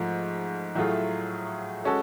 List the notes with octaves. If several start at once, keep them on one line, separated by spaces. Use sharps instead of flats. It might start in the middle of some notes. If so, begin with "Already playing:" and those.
Already playing: G#2 F3 A3
A2 F#3 A3 F4 G#4
G#3 C#4 F#4 A4